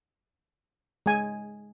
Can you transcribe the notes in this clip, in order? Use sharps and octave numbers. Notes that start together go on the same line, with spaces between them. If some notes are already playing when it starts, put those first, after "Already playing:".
G#3 G#5